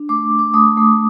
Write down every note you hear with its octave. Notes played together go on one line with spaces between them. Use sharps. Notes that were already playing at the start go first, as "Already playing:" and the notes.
Already playing: D4
A3 D6
A3
D6
A3 D#6
A3